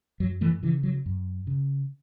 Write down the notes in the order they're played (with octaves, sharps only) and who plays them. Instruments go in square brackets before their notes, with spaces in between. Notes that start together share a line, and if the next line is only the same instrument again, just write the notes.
[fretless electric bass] F#2 F#3
E3 A3
C#3 E3
F#3
F#2
C#3